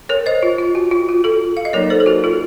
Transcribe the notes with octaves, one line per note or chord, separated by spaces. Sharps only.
A#4 C#5
C5 D#5
F4
F4
F#4
F4
F#4
F4 A4
F5
D#5
F#3 A#3 D#4 A#4 C#5
A4 C5
A4
F#4 A#4
F4 A4